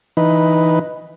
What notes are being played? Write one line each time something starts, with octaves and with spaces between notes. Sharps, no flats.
E3 D#4 B4